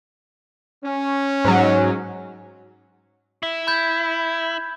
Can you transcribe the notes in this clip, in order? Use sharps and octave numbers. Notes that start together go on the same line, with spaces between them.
C#4
G#2 F#3
E4
B5 G6 G#6